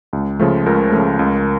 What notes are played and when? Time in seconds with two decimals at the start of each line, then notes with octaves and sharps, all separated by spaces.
0.13 C#2
0.39 C#3 F3 A3
0.66 C#2 A#4
0.92 C#3 F3 A3
1.19 C#2